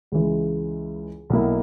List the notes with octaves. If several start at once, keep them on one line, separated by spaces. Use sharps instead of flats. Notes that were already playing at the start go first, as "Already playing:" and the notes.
C#2 C#3 E3 G#3
B1 B2 A#3 E4